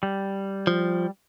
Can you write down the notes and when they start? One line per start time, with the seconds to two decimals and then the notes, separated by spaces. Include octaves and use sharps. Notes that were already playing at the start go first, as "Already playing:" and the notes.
0.03 G3
0.67 F3